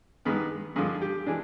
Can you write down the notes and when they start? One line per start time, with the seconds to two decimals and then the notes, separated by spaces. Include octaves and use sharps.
0.25 G2 D#3 G#3 B3
0.76 G2 D3 F3 G#4
1.02 G4
1.26 E3 G#3 D4